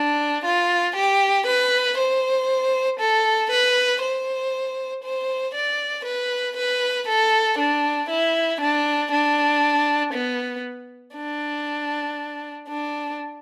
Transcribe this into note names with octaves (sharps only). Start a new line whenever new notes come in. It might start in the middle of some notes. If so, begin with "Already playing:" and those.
Already playing: D4
F4
G4
B4
C5
A4
B4
C5
C5
D5
B4
B4
A4
D4
E4
D4
D4
B3
D4
D4